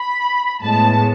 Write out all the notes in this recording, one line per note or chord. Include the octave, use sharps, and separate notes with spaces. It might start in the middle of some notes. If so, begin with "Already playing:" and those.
Already playing: B5
A2 G#3 B3 A5